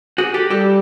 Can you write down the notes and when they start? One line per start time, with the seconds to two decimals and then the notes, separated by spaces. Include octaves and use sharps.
0.18 F#4 G#4
0.34 G4 A4
0.50 G3 G4 A4